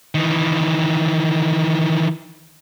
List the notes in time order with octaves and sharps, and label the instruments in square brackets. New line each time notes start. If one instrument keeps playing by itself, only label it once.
[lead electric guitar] D#3 E3